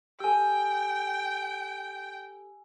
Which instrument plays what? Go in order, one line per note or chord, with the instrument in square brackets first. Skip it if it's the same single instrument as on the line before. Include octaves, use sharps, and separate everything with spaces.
[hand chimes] G4 A4 [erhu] G5 [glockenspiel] G#5 E6